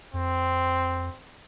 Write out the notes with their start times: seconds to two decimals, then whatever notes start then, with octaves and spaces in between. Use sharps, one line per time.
0.14 F2 C4